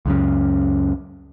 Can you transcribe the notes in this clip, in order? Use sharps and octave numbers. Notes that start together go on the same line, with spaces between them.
C#2 F#2 C#3